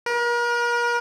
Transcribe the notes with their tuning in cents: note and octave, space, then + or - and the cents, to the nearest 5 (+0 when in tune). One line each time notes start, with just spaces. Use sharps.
A#4 +40